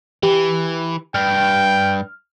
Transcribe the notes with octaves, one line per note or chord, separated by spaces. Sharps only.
E3 G4
G2 G5 F6